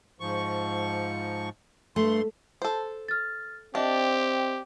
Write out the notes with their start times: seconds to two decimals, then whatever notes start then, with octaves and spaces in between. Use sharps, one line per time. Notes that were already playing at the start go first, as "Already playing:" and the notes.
0.20 G#2 F3 C#6
1.96 G2 A3 C6
2.62 A4 C5
3.08 F6 A6
3.75 C4 D4 G4 D#5 E5